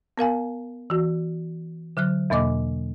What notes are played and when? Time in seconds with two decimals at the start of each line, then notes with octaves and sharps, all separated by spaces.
0.18 B3 A#4 F5 G#5
0.90 E3 F#4
1.97 D3 F#3 F6 F#6
2.30 E2 B2 A#3 D#5 D6